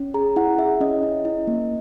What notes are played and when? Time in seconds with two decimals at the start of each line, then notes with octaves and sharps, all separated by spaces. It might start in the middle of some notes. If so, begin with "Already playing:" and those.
Already playing: C#4
0.14 G#4 A#5
0.36 E4 F#5
0.58 G#4 E5
0.81 C#4 D#5
1.03 E4
1.25 E4
1.47 A#3